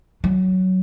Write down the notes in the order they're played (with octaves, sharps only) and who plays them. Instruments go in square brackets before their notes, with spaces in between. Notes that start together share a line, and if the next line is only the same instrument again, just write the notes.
[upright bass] F#3